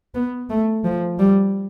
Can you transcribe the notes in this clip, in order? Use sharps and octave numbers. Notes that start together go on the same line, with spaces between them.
B3
A3
F3
G3